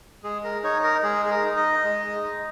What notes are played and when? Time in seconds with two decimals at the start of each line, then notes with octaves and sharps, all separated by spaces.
0.23 G#3 G#4
0.44 A#4
0.63 D#4 C#5
0.83 A#4
1.03 G#3 G#4
1.26 G#4
1.30 A#4
1.43 D#4
1.57 D#5
1.84 G#3
2.23 D#4